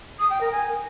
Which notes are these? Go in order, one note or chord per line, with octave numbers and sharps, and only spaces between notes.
D#6
G5
A#4
G#5